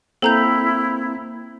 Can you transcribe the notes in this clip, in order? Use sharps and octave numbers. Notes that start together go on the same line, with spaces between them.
A#3 C4 E4 A4 A#5 G6